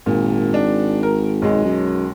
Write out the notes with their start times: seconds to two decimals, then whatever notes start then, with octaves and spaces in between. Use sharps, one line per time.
0.06 G#1 A#2
0.54 D4
1.03 A#4
1.42 B1 G#3
1.64 F#2